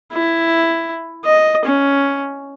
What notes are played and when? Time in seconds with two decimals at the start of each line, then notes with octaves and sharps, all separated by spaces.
0.13 E4
1.25 D#5
1.65 C#4